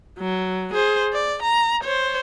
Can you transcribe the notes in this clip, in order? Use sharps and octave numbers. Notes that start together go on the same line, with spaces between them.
F#3
G#4 C5
D5
A#5
C5 C#5